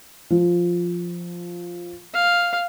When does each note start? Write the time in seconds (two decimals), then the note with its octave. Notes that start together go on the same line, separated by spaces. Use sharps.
0.30 F3
2.14 F5